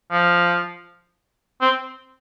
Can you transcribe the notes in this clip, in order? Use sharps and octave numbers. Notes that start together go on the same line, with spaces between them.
F3
C4